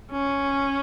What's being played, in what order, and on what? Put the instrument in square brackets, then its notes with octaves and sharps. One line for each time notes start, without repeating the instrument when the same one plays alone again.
[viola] C#4